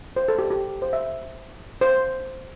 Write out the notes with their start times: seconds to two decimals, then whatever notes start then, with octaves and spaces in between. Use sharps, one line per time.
0.16 C5
0.28 A4
0.39 G4
0.50 G4
0.82 C5
0.93 E5
1.81 C5